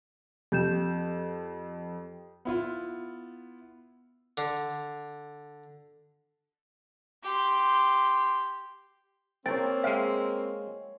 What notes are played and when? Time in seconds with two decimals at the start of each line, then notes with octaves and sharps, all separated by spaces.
0.52 F2 G4 G6 E7
2.45 B3 E4 F4
4.37 D3
7.24 G4 C6
9.46 A#3 C4 C5 C#5 G5 A#5 C6 A6
9.84 G#3 E5 F5 G5